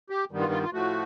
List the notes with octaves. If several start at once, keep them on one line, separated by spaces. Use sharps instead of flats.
G4
G2 D#3 G3 B3
F4
F4
F4
A2 F3 A3 F#4